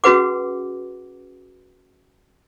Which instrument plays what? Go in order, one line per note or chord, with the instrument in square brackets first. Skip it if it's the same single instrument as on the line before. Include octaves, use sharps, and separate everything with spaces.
[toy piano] C#4 F#4 G#4 B4 F#5 D6